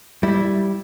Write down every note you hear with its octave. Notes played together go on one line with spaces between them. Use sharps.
G3 E4